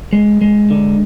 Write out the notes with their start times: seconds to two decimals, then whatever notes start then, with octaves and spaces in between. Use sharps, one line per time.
0.13 G#3
0.41 G#3
0.70 D3